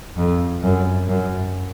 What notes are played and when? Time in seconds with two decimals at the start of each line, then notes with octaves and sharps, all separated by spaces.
0.17 F2
0.63 F#2
1.08 F#2